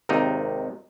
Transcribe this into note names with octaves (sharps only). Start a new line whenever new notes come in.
G#1 D#2 C3 D#4